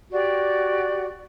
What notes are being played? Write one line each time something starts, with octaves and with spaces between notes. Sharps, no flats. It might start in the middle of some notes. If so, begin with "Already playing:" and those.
F#4 G4 D5